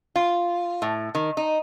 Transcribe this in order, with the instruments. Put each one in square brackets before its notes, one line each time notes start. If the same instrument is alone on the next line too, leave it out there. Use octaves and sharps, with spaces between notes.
[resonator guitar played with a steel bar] F4
A2
D#3
D#4